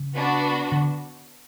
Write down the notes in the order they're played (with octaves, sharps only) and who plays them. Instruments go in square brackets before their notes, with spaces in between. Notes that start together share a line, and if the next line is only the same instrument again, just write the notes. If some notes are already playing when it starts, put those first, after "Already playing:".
Already playing: [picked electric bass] C#3
[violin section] B3 D4 F#4 B4
[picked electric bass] D3